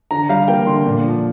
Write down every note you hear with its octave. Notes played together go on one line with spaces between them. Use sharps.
D3 A#5
G3 F5
A#3 G5
D3 C6
A#2
F3